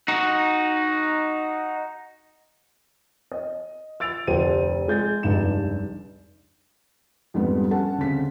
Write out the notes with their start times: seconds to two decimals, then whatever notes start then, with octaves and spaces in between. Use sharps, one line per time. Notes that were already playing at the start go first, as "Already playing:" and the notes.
0.08 D#4 F#4
3.32 D#5
4.00 E6 A6 D7 F7
4.27 F1 D2 G4 C5 D#7
4.88 G#3 G6 A6
5.23 F1 C#2 G2 D#4 E7
7.34 F2 G#2 G3 B3 D4
7.70 C#4 A4 F#5 A5
7.98 D2 C#3 C4 B6